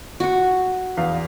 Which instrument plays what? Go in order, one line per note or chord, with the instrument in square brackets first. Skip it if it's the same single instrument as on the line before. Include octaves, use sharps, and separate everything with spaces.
[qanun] F#4 C#6
[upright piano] E2 F5